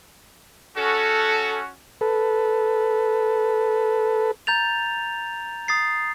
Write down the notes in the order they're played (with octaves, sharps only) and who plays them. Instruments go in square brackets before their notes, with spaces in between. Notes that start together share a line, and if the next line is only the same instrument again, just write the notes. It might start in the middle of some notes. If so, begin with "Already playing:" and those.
[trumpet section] C#4 F#4 [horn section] A4
[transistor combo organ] A4 B4
[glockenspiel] A#5 G6 A6 F7
D#6 A6 C7